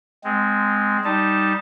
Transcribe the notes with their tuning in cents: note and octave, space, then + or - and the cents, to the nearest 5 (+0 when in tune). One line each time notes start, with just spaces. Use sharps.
G#3 +0 C4 -20
G3 +0 D#4 +0 A5 +0